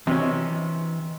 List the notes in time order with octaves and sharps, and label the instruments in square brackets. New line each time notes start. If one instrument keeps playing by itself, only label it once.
[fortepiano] C3 C#4 [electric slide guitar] E3 D#5